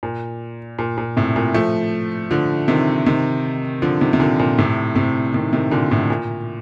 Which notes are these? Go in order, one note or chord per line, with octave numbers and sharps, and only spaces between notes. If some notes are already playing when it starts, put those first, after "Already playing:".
A#2
A#2
A#2
A2 C3
A#2
F3 A3
D3 F3
C3 D#3
C3 D#3
D3 F3
C3 D#3
C3
A#2 D3
A#2
A2 C3
A2 C3
C3 D#3
C3 D#3
A#2 D3
A2 C3
A#2